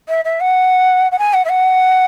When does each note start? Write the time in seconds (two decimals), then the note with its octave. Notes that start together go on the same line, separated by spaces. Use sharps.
0.08 E5
0.25 E5
0.40 F#5
1.12 F#5
1.19 G#5
1.34 F#5
1.45 E5
1.49 F#5